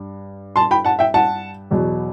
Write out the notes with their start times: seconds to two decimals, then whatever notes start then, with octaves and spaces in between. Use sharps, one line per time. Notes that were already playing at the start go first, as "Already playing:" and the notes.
Already playing: G2
0.56 A5 C6
0.71 G5 B5
0.85 F#5 A5
0.99 E5 G5
1.14 F#5 A5
1.71 E2 B2 F#3